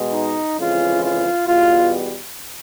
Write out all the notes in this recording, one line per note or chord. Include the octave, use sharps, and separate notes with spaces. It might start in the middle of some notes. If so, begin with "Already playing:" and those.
Already playing: B2 G#3
D#4
F2 C#3 E3 G#3 F4
F4
E2 B2 G3 F4